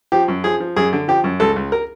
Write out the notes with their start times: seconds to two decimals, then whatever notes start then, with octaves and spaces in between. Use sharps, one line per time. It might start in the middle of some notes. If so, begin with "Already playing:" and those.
0.12 F3 G4
0.28 F#2
0.44 F3 G#4
0.60 F3
0.76 F#2 G#4
0.93 D3
1.08 F3 G4
1.24 F#2
1.40 C#2 A4
1.56 C#2
1.72 A#4